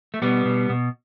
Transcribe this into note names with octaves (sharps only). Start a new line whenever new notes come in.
A3
B2 G3 B3
B2
B2